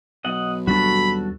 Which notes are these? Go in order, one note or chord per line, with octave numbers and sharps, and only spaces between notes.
B1 D#5 F#5
D#2 G3 D4 F#4 A4 B5